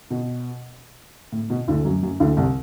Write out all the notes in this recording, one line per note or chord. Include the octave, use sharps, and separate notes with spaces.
B2
A2
B2
D2 D3
F#2 F#3
F#2 F#3
D2 D3
C2 C3